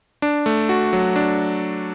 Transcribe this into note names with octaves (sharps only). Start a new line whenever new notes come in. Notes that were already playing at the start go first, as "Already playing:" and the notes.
D4
A3
F#4
F#3
D4